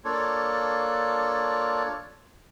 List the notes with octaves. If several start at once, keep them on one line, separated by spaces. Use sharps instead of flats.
A#3 D4 F4 A4 C#5